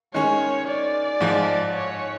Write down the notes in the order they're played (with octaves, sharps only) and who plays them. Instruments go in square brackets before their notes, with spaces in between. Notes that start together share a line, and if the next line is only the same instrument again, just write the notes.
[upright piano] D#3 G#3 C#4 [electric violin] C#5
[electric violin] D5
[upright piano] G#2 F3 G#3
[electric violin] C#5